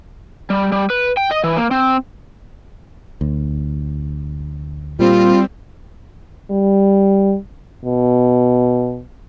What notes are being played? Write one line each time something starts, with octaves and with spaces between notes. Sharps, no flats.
G3
G3
B4
G5
D#5
E3
A#3
C4
D2
A#2 G3 C4 F4
G3
B2